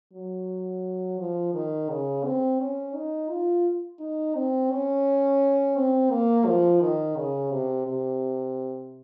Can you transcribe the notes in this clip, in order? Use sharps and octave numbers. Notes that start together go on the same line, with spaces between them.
F#3
F3
D#3
C#3
C4
C#4
D#4
F4
D#4
C4
C#4
C4
A#3
F3
D#3
C#3
C3
C3